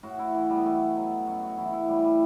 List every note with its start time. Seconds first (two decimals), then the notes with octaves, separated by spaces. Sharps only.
0.03 A2 F#4
0.19 E4
0.34 E3
0.50 G3
0.57 B3
0.65 B2 A3
0.96 F#3
1.27 F#2 F#4
1.42 F#4
1.57 E3 E4
1.73 E4
1.88 A2 G3
2.04 G3